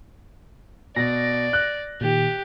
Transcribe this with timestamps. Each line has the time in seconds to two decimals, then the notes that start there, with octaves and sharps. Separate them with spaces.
0.96 B2 D5 A#6
1.53 F#6
2.01 A#2 D#3 G4